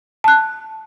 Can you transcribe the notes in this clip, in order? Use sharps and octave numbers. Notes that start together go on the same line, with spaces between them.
A5 F#6